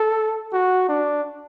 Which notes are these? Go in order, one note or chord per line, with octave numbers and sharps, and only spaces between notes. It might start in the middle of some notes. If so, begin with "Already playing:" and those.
Already playing: A4
F#4
D4